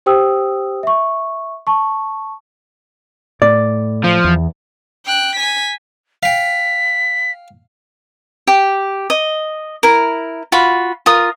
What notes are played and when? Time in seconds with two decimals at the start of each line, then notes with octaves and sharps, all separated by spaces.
0.06 G4 C5 G5 D#6 E6
0.83 E5 C#6
1.67 A5 C#6
3.42 A2 D5
4.04 F3
4.24 E2
5.06 G5 F#6
5.36 G#5 B6
6.23 F5 G5 B6
8.47 G4
9.10 D#5
9.83 E4 A#4
10.52 F4 F#4 B5
11.06 F4 A#4 D#6